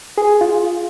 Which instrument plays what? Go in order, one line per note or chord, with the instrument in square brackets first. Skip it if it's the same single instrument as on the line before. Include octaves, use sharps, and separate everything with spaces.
[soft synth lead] G#4
F4